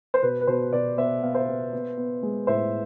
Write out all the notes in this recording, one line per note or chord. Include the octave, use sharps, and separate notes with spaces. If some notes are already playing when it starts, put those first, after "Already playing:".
C5
B2 B4
B4
B2 C5
B2 B4 D5
B3 C5 E5
B3 F5
C5 E5
B3
B3
B3
G#3
A2 C5 E5